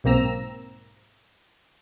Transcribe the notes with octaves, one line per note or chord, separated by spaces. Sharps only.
B1 G#2 A#3 C4 A#5 E6